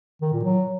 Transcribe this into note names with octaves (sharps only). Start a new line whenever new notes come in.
D#3
A#2
F#3